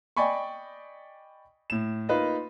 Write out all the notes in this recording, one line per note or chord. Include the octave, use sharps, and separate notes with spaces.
D5 D#5 G5 G#5 B5 C#6
A2 E7
A#3 D#4 F4 B4 D#5